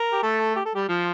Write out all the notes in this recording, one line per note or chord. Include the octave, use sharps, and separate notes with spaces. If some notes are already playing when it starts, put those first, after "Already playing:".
Already playing: A#4
G4
A3 A4
G4
A4
G3 G4
F3 F4